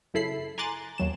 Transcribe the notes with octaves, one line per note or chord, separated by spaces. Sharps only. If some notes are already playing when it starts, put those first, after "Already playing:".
F#2 C#3 E4 A4 B5 C7
G#5 A#5 C6 D6 F#6 A6
D#2 F#3 E7